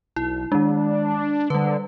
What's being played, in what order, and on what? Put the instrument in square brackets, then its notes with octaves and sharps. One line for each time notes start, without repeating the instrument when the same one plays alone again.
[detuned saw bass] B1 [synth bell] E4
[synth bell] D#3 G#3 [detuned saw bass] D4
[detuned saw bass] D3 [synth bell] G3 B4